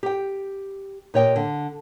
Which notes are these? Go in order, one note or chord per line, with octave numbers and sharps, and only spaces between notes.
G4 G5
A#2 G4 C#5 D#5 G5
D3